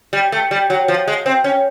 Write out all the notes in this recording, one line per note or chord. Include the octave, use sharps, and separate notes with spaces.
G3
A3
G3
F#3
F3
G#3
C4
C#4